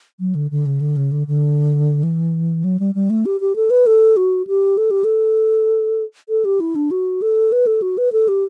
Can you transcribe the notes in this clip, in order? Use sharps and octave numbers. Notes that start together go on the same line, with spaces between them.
F#3
D3
D3
C#3
D3
C#3
D3
D3
E3
F#3
G3
G3
A3
G4
G4
A4
B4
A4
F#4
G4
A4
G4
A4
A4
G4
E4
D4
F#4
A4
B4
A4
F#4
B4
A4
G4